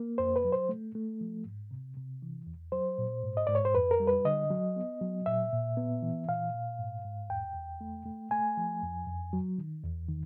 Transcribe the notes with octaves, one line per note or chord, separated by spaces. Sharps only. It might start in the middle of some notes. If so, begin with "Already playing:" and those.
Already playing: A#3
F2 C5
B4
F#3
C5
A3
A3
F3
G#2
C3
C3
E3
E2
F#3 C5
A#2
G#2
D#5
G#2 D5
C#5
C5
F2 B4
A#4
G3
B4
D3 D#5
F#3
B3
F#3
A#2 E5
A#2
B3
E3
A#2 F5
A#2
G#2
G#2
E2 G5
E2
A3
A3
A3 G#5
F3
F2
F2
F#3
D#3
E2
D#3